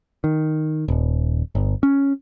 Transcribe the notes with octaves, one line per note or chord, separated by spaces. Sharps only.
D#3
D#1
G1
C#4